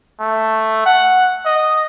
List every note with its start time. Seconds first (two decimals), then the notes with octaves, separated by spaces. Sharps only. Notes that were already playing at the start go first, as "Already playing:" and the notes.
0.20 A3
0.86 F#5
1.46 D#5